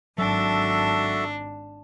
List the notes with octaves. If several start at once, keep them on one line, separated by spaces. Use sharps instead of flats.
G#1 F#3 D4 F#4 A4 E5